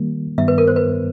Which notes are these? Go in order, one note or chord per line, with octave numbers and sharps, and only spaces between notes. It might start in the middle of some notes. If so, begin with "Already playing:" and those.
Already playing: D#3 G3 A#3
G2 D#3 G3 B3 E5
B4
A#4
C5
B4